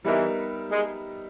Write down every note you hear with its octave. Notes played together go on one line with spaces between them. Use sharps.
E3 G3 B3 D#4 A#4 E5
G#3